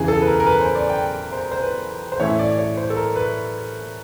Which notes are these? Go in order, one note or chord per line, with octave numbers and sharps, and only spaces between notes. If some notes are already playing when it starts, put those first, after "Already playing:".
Already playing: E2 C#3 E3 G#4
A4
B4
A#4
A#4
B4
C5
D5
G5
C5
C5
B4
C5
A2 E3 A3 C#4 E4 C#5
D5
C#5
C5
A4
A#4
B4